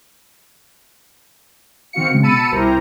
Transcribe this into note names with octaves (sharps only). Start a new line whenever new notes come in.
D#3 C4 F#4 F5 C#7
C#3 G#3
B2 A5 B5 E6 C#7 D#7
C2 E4 G4 A#4 C5 A#5